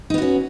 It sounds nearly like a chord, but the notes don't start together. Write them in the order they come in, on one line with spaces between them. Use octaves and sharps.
D#4 B3 F#4 C#4